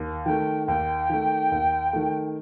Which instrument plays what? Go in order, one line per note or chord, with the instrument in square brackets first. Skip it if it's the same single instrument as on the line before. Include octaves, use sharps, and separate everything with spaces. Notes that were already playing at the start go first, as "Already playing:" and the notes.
Already playing: [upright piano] D#2
[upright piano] D#3 A3 [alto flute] G5
[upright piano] D#2 [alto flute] G5
[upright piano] D#3 A3
D#2
D#3 A3